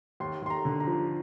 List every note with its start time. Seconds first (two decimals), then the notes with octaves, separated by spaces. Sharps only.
0.20 D#2 C6
0.42 D#2 C6
0.50 A#5
0.65 D3
0.80 A#5
0.87 F3